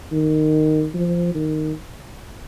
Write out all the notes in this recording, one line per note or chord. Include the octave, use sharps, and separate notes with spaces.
D#3
F3
D#3